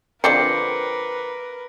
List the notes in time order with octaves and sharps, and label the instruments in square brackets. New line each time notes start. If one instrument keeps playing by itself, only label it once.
[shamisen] D3 F3 C4 [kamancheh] A#4 B4 [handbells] D6 C7 C#7